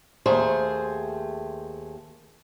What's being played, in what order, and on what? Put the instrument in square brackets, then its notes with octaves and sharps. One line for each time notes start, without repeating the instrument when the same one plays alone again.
[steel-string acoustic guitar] D#2 A3 G#4 C5